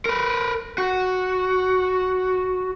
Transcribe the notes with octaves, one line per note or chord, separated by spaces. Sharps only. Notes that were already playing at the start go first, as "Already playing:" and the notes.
A#4 B4
F#4